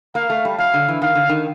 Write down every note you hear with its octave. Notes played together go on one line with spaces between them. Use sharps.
A#3 F5
A3
G3
F#3 F5
D3
E3
D#3 F5
D3
D#3